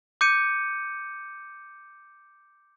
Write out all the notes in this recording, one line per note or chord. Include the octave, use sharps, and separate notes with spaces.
D6 G6 C#7 D#7